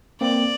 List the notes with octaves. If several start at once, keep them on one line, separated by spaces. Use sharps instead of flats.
A#3 C4 D5